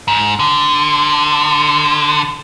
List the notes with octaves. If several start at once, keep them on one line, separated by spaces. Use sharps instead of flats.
G#2
D3